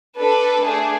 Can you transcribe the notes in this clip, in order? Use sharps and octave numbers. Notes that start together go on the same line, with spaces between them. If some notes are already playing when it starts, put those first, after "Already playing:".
D4 A4 B4
A3 D4 G#4